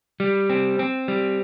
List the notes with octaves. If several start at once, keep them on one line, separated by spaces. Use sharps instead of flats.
G3
C4
C4
G3